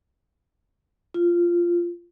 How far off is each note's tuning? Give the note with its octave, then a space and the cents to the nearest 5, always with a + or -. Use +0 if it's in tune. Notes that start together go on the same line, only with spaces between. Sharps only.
F4 -10